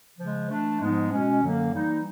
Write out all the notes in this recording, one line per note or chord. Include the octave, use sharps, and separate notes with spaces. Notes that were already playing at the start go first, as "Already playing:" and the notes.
C#3 F3 G#3
E3 A3 D4
G#2 F3 G#3 B3 D#4
B2 G#3 C#4
F#2 D3 F#3 A#3
E3 G3 A#3 D#4